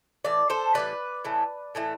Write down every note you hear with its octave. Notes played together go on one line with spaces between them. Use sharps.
A2 E3 D5
A4 C5
A2 E3 G3 B4 D5
A2 E3 A3
A2 E3 A3